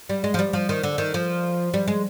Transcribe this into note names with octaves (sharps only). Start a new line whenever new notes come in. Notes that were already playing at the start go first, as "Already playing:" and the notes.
G3
G#3
F3
G3
F3
D#3
D3
D#3
F3
G3
G#3